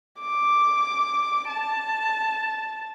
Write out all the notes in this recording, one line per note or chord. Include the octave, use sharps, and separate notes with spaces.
D6
A5